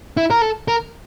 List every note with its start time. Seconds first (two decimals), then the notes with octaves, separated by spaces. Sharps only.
0.17 E4
0.30 A#4
0.42 A4
0.68 A#4